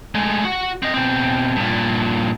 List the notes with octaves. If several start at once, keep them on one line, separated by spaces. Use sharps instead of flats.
G#3 A3
F#4
C4 D#5
B2 C4
G2 A#2